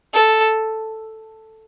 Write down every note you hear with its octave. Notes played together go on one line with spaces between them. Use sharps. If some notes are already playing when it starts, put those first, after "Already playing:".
A4